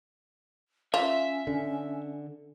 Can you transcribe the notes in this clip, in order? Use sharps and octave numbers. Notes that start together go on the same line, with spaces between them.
C#4 F4 E5
D3